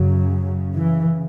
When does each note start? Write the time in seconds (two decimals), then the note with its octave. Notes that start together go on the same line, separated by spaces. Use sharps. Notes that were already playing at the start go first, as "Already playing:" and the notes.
Already playing: F#2 C#3 F#3
0.75 E3